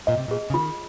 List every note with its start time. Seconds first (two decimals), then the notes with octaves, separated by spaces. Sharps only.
0.07 A#2 D#5
0.18 C3
0.28 A#2 G#4
0.50 C#3
0.54 D#3 F4